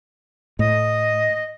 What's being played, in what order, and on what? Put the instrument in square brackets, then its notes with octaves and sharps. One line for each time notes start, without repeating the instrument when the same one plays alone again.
[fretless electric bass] A2 [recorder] D#5